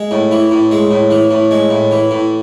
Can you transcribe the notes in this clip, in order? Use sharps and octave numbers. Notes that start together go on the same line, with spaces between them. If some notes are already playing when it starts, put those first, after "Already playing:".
Already playing: G#3
A2
E3
A2
G#3
A2
E3
A2
G#3
A2
E3
A2